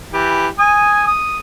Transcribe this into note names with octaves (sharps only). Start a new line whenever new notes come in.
E3 G4
G#5 D#6
D#6